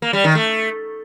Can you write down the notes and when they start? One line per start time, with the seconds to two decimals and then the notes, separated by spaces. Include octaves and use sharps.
0.02 A#3
0.13 G3
0.24 D#3
0.35 A3